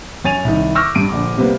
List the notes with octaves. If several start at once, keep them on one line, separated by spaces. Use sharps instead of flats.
F#2 C#5 G#5 A6 D#7 F7
C2 D#3
C#6 D6 E6 F6 G6 A#6
G2 D7 D#7
A#1 D3 D6
C3 G3 A#3 B3